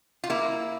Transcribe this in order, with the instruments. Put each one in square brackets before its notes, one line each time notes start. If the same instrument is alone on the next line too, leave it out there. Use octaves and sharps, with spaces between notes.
[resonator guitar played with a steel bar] F4
A#3 E4